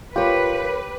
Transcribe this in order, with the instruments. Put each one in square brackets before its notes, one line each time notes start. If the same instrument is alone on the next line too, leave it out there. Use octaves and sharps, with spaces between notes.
[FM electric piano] F4 [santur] G4 [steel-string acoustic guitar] A#4 C#5 [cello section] B4